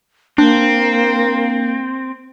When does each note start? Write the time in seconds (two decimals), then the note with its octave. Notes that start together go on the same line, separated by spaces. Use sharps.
0.38 A#3 C4 D4